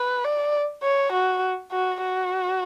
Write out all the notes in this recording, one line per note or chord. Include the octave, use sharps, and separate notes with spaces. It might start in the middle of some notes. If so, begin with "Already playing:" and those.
Already playing: B4
D5
C#5
F#4
F#4
F#4